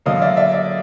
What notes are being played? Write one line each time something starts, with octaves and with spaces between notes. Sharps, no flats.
D3 F#3 A#3 D#5 F5
D5 E5
D5 E5
D5 E5